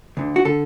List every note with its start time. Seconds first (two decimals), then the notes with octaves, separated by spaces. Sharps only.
0.17 D2 D3
0.36 F#4
0.45 D3 A4